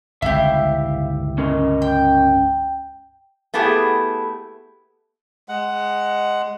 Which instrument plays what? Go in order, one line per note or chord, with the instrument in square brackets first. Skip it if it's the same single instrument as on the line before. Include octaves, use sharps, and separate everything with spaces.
[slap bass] G1 C#2 C4 [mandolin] E4 G4 [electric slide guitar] E5 F5
[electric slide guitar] C#4 A#4 D#5
[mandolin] G5
[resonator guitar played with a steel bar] A3 B3 E4 G4 G#4
[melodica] G#3 F#5